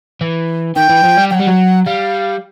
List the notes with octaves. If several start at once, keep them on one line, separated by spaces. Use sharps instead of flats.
E3
D#3 G5
E3
F3
G3
F#3 G5
G3 F#5
F#3
G3 F5